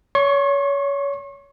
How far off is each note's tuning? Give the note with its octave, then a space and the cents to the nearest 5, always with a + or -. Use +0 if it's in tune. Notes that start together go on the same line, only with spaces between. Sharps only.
C#5 +25 C#6 -40